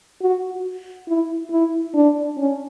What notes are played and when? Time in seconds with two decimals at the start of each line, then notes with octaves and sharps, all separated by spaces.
0.22 F#4
1.08 E4
1.51 E4
1.94 D4
2.37 C#4